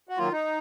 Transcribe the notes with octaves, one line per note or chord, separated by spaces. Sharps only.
F#4
D#3 F#3 A#3 F4
D#4